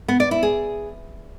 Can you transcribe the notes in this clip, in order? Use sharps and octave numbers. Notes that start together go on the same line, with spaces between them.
B3
D5
E4
G#4